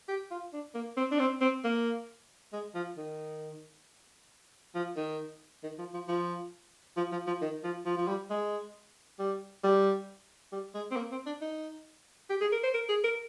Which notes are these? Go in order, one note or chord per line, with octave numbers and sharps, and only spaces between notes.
G4
F4
D4
A#3
C4
D4
C4
C4
A#3
G#3
F3
D#3
F3
D#3
D#3
F3
F3
F3
F3
F3
F3
D#3
F3
F3
F3
G3
G#3
G3
G3
G3
G#3
C4
A#3
C4
D4
D#4
G4
G#4
A#4
C5
A#4
G#4
A#4